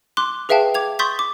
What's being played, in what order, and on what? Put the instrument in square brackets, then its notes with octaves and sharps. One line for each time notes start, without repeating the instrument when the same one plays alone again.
[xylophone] C6 D6 F#6
G#4 B4 E5 F5 G5 A5
D6 G#6 F7
C6 C#6 D#6 G6 A6 B6
D6